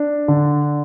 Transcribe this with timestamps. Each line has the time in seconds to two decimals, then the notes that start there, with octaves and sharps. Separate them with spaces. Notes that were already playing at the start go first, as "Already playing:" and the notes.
Already playing: D4
0.28 D3